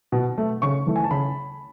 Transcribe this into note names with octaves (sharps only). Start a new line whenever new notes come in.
B2
A3
C#3 C#6
E3 A3
G#5
A5
C#3 B5